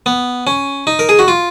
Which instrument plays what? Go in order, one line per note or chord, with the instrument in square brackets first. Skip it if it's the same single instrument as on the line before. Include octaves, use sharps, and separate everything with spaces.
[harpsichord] B3
C#4
D#4
A#4
G#4
F#4
F4